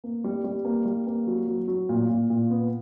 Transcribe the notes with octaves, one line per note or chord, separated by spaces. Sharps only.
A#3
G3
G3
A#3
G3
A#3
F#3
F#3
F#3
A#2
A#2
A#2
B3